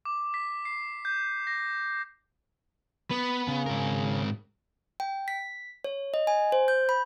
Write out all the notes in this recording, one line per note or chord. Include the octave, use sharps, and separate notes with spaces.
D6
B6
C7
G6
A#6
B3 B4
C#3
G#2 A#4
G5
B6
C#5
D#5
G#5
C5
G6
B5